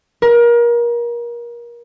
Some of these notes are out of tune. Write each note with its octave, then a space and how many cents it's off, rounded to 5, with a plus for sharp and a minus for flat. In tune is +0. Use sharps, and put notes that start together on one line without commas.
A#4 +30